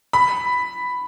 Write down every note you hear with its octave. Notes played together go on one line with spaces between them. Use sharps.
B5